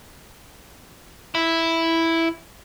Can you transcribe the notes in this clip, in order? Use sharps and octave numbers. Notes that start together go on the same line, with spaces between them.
E4